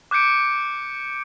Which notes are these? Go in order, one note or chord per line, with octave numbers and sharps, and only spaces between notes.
D6 F#6 G6 C#7 D7